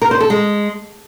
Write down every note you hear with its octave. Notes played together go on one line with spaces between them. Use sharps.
A#4
C5
A4
G#3